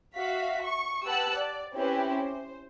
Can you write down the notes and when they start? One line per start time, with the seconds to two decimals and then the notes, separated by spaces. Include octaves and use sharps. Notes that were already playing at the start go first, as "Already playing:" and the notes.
0.16 F#4 E5 F5 B6
0.66 C#6
1.07 G4 B4 F#5 A5 E6 F#6
1.36 D5
1.74 C4 C#4 E4 G4 B4
2.12 C5